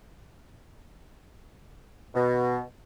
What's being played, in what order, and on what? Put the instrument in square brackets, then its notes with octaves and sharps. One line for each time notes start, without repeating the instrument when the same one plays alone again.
[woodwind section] B2